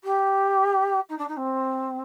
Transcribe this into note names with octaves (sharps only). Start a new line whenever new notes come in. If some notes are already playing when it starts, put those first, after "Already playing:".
G4
D#4
D4
D#4
C4